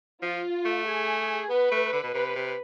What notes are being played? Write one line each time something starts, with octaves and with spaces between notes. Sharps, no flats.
F3 F4
A3
G#4
B3 B4
A3
D3
B2
C3 B4
C3